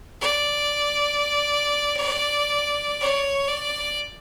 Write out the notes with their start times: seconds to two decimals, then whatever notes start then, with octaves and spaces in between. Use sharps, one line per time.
0.21 D5
3.01 C#5
3.48 D5